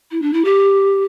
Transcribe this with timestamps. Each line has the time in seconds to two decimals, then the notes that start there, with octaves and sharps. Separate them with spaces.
0.11 E4
0.21 D4
0.33 E4
0.44 G4